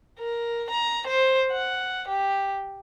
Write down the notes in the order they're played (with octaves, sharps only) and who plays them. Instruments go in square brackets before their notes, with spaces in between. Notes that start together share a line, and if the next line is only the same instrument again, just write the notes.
[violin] A#4
A#5
C5
F#5
G4